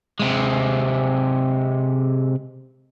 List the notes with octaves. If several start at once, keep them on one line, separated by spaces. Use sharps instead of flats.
C3 G#3